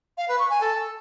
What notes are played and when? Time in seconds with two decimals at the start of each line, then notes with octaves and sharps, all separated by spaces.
0.17 F5
0.28 B4
0.39 C#6
0.50 G#5
0.61 A4